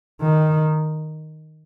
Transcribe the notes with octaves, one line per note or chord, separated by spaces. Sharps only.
D#3